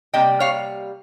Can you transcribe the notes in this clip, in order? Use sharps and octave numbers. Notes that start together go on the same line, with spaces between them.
C3 G3 A#3 D#5 G5
C#5 F5